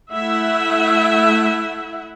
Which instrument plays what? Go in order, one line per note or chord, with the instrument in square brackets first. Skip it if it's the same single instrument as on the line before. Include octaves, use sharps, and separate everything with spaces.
[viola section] A3 E4 E5 F#5